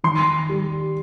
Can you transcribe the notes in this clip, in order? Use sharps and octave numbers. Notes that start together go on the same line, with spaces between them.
D#3 C6
G3